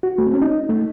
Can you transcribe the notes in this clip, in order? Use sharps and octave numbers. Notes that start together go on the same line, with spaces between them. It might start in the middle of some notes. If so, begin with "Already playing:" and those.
F#4
A3
C4
C#4
D#4
A3